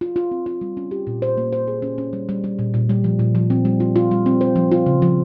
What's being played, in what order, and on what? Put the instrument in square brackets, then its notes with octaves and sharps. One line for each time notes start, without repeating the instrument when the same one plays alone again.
[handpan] F4
F4
C4
F4
G3
C#4
G4
A#2
C5
A#3
C5
G#4
C#4
C#4
G3
G3
G3
A#2
A#2
G3
F3
A#2
F3
C4
G3
F4
F4
G3
C4
C5
F3
F4
C#3
F3